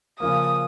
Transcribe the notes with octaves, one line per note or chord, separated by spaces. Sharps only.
C#3 F3 A#3 D#6